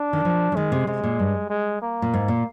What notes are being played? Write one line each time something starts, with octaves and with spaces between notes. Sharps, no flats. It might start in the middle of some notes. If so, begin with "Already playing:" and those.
Already playing: D4
D#3
F3
F3
D#3 G#3
C3
C3 G#3
A#2
G2
G#3
A#3
A#2
G#2
A#2